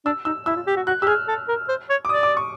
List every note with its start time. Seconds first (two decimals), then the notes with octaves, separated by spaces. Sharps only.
0.05 D4 E6
0.25 D#4 E6
0.46 E4 E6
0.56 F4
0.67 G4
0.76 F#4
0.87 F#4 F#6
1.02 G4 E6
1.07 G#4 F6
1.28 A4
1.48 A#4
1.69 C5
1.89 C#5
2.05 D6
2.09 D5 D#6
2.23 D6
2.37 C#6